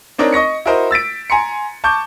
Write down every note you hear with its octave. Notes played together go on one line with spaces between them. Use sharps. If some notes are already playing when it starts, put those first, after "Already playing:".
C4 D4 D#4 A#4 C#5
D#5 C#6 A#6 C#7
E4 F#4 A#4 C5 D#5
E6 A6 B6 D7
G#5 A#5 C6 C#7
A5 C#6 D6 G6